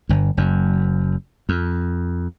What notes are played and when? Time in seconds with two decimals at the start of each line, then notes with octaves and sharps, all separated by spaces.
0.09 G1 G2
0.37 F#1 F#2
1.49 F2